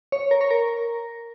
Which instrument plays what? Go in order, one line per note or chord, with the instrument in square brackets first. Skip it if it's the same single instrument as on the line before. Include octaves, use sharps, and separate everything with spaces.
[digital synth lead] C#5
A#4
C#5
A#4